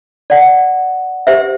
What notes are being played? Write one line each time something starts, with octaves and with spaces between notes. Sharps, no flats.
D5 F#5
G4 C5 E5